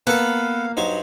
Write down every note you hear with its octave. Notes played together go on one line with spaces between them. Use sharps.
A#3 B3 A4 B4 F5 F#5
G2 F#3 D#4 C5